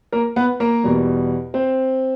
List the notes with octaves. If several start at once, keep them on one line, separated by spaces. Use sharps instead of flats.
A#3 A#4
B3 B4
A#3 A#4
E2 B2 G3
C4 C5